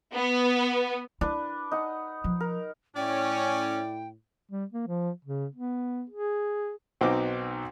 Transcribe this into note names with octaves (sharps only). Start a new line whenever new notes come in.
B3
D4 E4 B4
D#4 F#5
F3
A#4
A2 C#4 E4 D5 G5
G3
A#3
F3
C#3
B3
G#4
B1 C4 D#4 F#4 D6